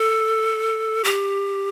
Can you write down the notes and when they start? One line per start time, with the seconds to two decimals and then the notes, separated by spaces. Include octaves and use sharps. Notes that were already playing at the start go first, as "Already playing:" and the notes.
Already playing: A4
1.04 G4